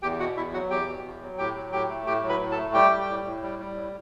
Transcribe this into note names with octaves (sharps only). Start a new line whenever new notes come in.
E2 G4 G5
B2 F#4 F#5
E2 E4 E5
F#3 F#4 F#5
E2 G4 G5
B2
E2
F#3
A2 G4 G5
F#3
A2 G4 G5
A3
A2 G4 G5
F#3
B4 B5
A2
A4 A5
A3
G3 G4 G5
G3
A2
A2
G3
G3
A2